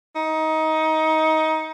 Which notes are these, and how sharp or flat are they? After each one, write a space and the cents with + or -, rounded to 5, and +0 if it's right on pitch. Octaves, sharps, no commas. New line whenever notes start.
D#4 +20